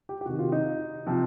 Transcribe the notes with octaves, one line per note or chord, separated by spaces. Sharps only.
G4
G4
C3 D#3 F#4
F4
D#4
C3 F3